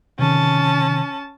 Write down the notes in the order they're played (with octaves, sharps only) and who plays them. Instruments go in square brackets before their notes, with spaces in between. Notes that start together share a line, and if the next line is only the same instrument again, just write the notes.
[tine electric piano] C3 D#3 [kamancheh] C#4 A5